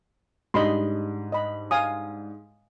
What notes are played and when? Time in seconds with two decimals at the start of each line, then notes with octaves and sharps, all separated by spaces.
0.54 G#2 G3 D4 D#5 B5 C6
1.32 D#5 B5
1.71 F5 G#5 D#6